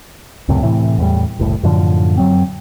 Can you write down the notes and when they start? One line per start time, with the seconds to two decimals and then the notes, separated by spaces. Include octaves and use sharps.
0.48 C#2 F#2 A2 C3
0.63 A2 C3 E3
0.98 E2 A2 G3
1.39 F#1 C2 A2
1.63 F#2 A2 D3 F3
2.18 F#2 F#3 C4